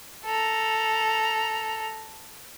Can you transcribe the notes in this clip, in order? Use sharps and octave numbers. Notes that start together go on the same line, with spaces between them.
A4 A#5